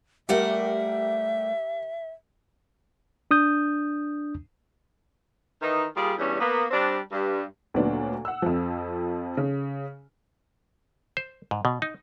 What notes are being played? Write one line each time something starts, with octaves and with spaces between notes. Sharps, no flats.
G3 A3 G4 A#4 E5 F#5
D4 D#6 G6
D#3 E3 D#4
G3 A#3 F4 G#4
E2 G2 G3 C#4
A#3 B3
G3 C4 D4
G2
D2 A#2 F#3 B3 D4
F#5 E6
F2 F3
C#3
C5
G#2
B2
D#4